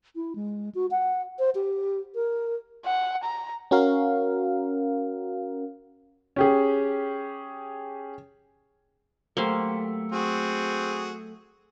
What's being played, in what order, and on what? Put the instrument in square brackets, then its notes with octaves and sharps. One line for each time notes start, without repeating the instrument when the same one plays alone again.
[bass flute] E4
G#3
F#4
F#5
C5
G4
A#4
[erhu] F#5
A#5
[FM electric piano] C#4 F#4 A#4 F5
[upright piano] C#4 G4 G#4
[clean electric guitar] F#3 A3 G4 [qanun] A#3 C5
[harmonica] C4 F#4 G#4